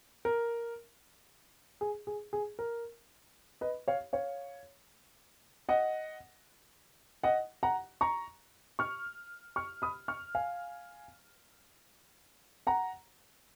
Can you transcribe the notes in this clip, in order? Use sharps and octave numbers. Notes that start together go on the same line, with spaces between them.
A#4
G#4
G#4
G#4
A#4
B4 D#5
C#5 F5
C#5 F5
D#5 F#5
D#5 F#5
F#5 A#5
A#5 C#6
C#6 F6
C#6 F6
B5 D#6
C#6 F6
F5 G#5
F#5 A#5